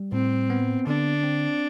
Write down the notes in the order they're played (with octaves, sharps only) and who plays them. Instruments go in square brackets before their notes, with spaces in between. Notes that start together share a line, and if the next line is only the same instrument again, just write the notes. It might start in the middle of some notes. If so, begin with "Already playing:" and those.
Already playing: [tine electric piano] G3
[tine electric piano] A2 [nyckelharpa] C4
[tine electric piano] B3
[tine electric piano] D3 [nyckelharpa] D4
[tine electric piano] C4